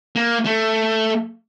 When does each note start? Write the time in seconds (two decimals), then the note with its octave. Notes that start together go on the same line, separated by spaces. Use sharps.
0.16 A#3
0.46 A3